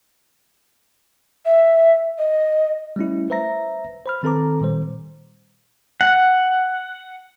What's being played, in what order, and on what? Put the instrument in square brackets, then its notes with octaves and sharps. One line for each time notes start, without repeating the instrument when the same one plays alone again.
[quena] E5
D#5
[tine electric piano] G3 A3 C#4 E4
B4 C5 E5 A#5 A#6
C5 B5 F6
D#3 C4 A4 B4 A#5 D6
A#2 D#3 G3 C5
[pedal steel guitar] F#5